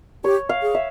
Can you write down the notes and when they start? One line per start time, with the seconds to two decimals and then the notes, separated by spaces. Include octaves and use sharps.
0.24 G4 C#5
0.49 F5
0.62 G#4
0.75 E5